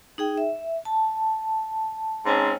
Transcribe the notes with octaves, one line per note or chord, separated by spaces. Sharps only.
D#4 G#4 G5
E5
A5
G#2 C4 C#4